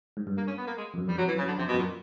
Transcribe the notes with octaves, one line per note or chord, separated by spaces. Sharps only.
G#2
G2
A#3
C#4
B3
A#3
G#3
F2
F#2
F2 G3
F2 F#3
F#2 E3
C#3
F#2
D3
F2 C3
B2
F#2
A#2